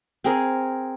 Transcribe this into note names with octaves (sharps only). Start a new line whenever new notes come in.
C4 G#4 A#4